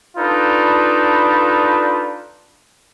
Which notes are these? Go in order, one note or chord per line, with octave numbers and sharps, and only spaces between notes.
D4 D#4 F4 A4 B4